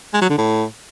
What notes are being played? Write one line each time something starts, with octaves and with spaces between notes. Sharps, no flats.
G#3
F#3
D3
A2